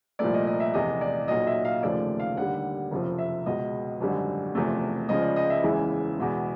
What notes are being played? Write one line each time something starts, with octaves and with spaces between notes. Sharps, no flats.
C2 A#2 F3 A3 D5
D#5
D#5
E5
F1 E2 C3 D#5
D5
B1 A#2 F#3 D#5
E5
F5
F1 D#2 C#3 F3 A3 D5
F5
D#2 D3 G3 F#5
F#1 F2 C3 F3
E5
C#2 B2 G#3 D#5
G#1 F#2 D3 G3
F#1 E2 C3 F3 A3
C#2 C#3 F3 D#5
D5
D#5
E5
F#1 E2 C#3 E3 G#3
E2 B2 G#3